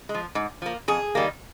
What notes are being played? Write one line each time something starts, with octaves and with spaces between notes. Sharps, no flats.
G#3
F3
G#2
F3 A#3
F2 G#4
D#3 G3 A#3